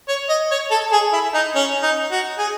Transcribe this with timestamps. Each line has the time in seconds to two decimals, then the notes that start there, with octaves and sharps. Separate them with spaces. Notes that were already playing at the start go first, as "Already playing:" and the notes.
0.08 C#5
0.29 D#5
0.51 C#5
0.71 A4
0.92 G#4
1.13 E4
1.34 D#4
1.55 C#4
1.82 D#4
2.11 F#4
2.38 G#4